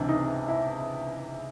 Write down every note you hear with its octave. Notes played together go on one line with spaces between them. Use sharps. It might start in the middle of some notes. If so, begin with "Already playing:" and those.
Already playing: C#2 C3 E3 D4
D#4
E4